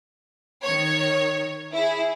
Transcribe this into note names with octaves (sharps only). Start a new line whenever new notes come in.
D#3 C#5
E4 G#4